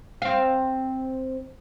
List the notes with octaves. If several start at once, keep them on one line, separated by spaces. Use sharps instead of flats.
C4 F5